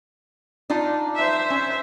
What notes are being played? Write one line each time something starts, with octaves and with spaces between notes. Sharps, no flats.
D4 D#4 F4
C5 E5
C#4